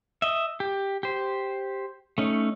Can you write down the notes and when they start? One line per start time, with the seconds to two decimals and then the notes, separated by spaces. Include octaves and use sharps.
0.22 D#5 E5
0.60 G4
1.03 G4 C5
2.18 A3 C#4 D#4